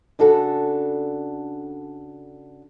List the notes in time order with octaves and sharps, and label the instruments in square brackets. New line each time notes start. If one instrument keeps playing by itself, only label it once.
[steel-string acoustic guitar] C#3 D4 F#4 A4